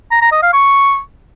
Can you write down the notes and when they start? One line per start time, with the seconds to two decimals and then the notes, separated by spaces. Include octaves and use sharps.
0.11 A#5
0.22 A#5
0.32 D#5
0.43 F5
0.53 C#6